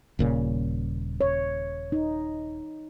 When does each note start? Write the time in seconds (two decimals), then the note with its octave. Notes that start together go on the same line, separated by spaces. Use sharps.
0.19 D#1 A#2 C#3
1.21 C#5
1.92 D#4